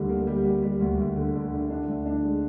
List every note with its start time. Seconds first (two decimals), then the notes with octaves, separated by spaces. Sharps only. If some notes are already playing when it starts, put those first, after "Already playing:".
Already playing: D2 D3 G3
0.09 A#3
0.27 G3
0.45 G3
0.62 G3
0.80 D2
0.99 D2
1.17 D3
1.34 D3
1.52 D3
1.70 D4
1.88 D2
2.06 D4
2.24 G#3